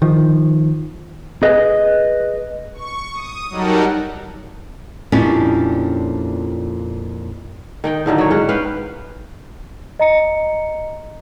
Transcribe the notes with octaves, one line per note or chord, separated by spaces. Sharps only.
D#3 F3
G#4 B4 D#5
C#6
D#6
F#3 G3 D#4 A4 A#4 F#5
F2 A#2 C#4 D4 E4 G4
D#3 D#4 G5
A2 D3 D#3 F#3
F#3 C#5
G#2 C#4 F#5
B3 B4 F5 G5
D#5 A#5 C#7